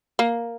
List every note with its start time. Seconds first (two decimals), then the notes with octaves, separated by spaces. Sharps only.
0.19 A#3